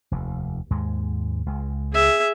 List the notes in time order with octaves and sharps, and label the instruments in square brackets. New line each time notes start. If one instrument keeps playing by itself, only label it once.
[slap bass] F1 D#2
D#2 G#2 G#3
C#2 G#3
[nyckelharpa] G#4 E5